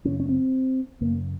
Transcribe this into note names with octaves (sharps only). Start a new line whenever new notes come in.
F#2 C#3 C#4
C#4
C4
F#2 C#3 A#3